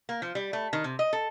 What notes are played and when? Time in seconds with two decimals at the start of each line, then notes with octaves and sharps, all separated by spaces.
0.09 A#3
0.22 F3
0.35 G3
0.53 A3
0.73 D#3
0.84 C3
0.99 D#5
1.13 A4